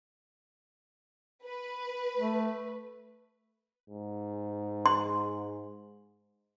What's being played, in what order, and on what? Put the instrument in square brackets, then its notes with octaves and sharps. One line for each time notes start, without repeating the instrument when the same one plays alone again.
[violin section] B4
[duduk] A3
[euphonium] G#2
[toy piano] C6